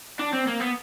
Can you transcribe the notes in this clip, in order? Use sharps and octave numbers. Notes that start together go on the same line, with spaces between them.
D4
C4
A#3
B3